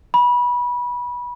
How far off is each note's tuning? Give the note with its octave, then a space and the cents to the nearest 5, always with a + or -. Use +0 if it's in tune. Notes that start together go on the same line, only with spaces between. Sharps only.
B5 -20